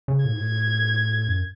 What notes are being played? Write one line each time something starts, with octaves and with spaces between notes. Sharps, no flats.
C#3
A2 G#6
G#2
A2
F#2